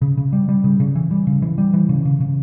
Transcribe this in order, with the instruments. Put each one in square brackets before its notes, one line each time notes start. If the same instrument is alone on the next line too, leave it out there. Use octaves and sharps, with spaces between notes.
[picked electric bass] C#3
C#3
G3
G3
C#3
C#3
E3
G3
C#3
E3
G3
E3
C#3
C#3
C#3